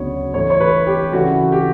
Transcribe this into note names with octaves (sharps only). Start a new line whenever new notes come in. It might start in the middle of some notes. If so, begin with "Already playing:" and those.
Already playing: D2 C#3 F#3 B3 D4 C#5
A2 E3 A3 D4 C#5
C#5
B4
G4
C#3 E3 A3 D4 F#4
G4